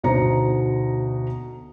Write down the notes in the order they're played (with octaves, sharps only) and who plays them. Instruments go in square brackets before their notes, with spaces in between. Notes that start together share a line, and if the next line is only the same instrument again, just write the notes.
[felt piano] D2 B2 D#4 C5 A#5 C#7